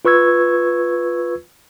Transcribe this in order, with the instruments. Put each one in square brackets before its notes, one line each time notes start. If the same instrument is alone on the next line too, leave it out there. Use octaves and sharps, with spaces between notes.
[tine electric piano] F4 B4 C#6 E6 G#6